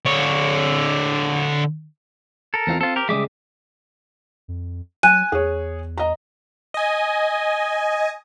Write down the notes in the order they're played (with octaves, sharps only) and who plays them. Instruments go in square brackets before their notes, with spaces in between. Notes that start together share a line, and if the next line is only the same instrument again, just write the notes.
[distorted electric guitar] D3 C#5
[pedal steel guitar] A4 A#4
[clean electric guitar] E2 C4 F4
[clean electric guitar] C4 [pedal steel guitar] F4 A4
[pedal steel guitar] G4 A#4
[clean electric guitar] C#3 G3 G#3 [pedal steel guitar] E5 D6 D#6
[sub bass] F2
[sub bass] F#3 [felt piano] G#5 [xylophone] F#6 D#7
[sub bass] E2 [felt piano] G#4 C#5
[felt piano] D#5 A#5
[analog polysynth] D#5 G#5